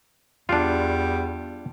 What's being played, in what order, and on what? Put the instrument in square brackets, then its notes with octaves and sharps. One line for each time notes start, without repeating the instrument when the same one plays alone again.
[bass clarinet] E2 [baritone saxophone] G3 [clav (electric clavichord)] D4 F4